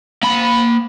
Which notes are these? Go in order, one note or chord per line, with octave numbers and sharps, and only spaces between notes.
A#3 B5